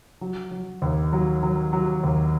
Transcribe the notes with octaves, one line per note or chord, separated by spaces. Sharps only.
F#3
F#3
D#2
F#3
F#3
F#3
D#2